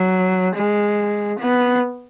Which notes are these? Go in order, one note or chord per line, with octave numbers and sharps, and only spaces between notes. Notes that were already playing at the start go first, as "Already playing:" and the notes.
Already playing: F#3
G#3
B3